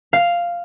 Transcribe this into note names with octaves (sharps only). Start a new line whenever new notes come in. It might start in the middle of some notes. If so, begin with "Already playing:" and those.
F5